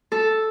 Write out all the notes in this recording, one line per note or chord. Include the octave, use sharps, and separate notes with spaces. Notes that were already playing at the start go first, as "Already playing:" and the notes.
A4